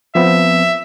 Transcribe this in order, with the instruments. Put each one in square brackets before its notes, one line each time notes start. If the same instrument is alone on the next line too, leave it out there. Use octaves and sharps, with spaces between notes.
[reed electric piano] F3 B3 C4 [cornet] E5